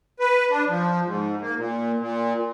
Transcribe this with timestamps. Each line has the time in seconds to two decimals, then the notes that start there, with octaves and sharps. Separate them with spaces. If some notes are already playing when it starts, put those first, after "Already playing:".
0.19 B4
0.51 D4
0.68 F3
1.05 G#2
1.41 A#3
1.58 A#2
1.99 A#2